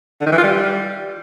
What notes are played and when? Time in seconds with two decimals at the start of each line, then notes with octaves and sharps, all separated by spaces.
0.21 D3
0.27 D#3
0.32 E3
0.38 F4
0.44 G3